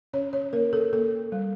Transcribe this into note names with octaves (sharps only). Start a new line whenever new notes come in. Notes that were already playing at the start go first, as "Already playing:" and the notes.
C#4 C#5
C#5
A#3 A#4
A4
A#3 A4
G3